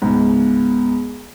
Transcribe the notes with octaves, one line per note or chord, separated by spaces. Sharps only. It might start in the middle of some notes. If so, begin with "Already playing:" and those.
C#2 G#2 B3